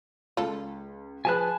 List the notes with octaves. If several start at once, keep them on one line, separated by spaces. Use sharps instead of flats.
C#2 F4 A4
F3 G#4 B4 G#5 A5 F#6